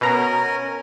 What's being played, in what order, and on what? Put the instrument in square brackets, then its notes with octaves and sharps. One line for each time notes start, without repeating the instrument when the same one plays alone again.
[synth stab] B2 A#5 [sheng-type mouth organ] C#4 A#4